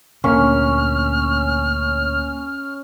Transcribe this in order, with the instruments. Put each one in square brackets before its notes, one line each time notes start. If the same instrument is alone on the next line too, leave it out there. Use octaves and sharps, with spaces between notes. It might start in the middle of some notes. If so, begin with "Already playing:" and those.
[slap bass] D2 A#2 [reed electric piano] A#3 [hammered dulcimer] C#4 [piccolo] F6